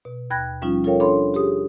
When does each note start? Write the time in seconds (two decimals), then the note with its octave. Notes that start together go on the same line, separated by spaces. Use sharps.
0.05 B2
0.30 D#2 G5 B5 F#6 G#6 A#6
0.62 F3 G3 C#4 D#4 F4
0.84 F4 A4 A#4 C#5 F5 G5
1.00 D4 A4 C#5 B5 C6
1.34 G4 G#4 D#6